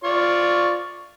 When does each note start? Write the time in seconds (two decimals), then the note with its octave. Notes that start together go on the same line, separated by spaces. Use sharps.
0.04 F4 D5 C#6